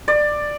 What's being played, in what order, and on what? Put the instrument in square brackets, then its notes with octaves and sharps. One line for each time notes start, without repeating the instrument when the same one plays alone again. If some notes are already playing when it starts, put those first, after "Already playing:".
[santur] D5